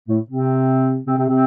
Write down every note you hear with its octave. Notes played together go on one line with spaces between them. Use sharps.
A2 A3
C3 C4
C3 C4
C3 C4
C3 C4